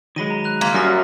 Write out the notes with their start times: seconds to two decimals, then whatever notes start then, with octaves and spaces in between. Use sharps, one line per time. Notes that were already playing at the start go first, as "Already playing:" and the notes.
0.16 D#3 F#3 G#3 B5 A#6 D#7
0.31 A#5
0.44 F#6 F7
0.61 A#3 C6 G#6 B6
0.74 F#2 G3 F6 A#6